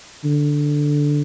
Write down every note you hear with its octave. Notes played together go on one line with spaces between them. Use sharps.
D3